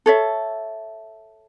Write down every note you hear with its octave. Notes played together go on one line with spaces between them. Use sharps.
A4 C#5 E5